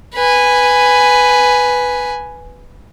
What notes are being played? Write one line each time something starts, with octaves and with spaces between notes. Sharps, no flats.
B4 G#5